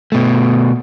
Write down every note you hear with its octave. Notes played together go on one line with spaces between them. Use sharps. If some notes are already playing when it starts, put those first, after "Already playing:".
B2 A3